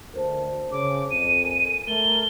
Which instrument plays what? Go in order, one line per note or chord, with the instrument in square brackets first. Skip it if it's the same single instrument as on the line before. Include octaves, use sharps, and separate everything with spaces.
[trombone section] D2 [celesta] A#4 C5 A5
[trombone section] C#3 [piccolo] D6
[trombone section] F2 [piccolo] D#7
[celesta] A#4 G#5
[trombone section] A3 A#4 [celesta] A6 [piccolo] G7